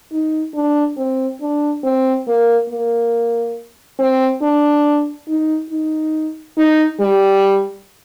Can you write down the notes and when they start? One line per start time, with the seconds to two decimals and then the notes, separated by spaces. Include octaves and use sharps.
0.12 D#4
0.55 D4
0.97 C4
1.42 D4
1.84 C4
2.27 A#3
2.70 A#3
3.99 C4
4.42 D4
5.28 D#4
5.70 D#4
6.57 D#4
7.00 G3